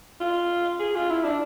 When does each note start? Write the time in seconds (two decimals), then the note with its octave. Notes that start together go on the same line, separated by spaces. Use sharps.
0.20 F4
0.79 G#4
0.95 F4
1.09 E4
1.24 D4